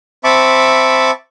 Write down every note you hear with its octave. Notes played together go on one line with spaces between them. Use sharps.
C4 E5 A5 B5 C#6 D6